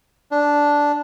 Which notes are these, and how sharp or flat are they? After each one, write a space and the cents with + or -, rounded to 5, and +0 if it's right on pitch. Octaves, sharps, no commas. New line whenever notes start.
D4 -5